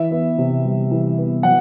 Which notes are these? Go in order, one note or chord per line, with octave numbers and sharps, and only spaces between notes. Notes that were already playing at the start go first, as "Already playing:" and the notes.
Already playing: E3 E5
B3
C3
G3
E3
B3
F#3 F#5